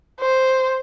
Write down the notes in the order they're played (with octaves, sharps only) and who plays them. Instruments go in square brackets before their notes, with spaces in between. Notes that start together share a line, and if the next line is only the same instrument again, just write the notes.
[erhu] C5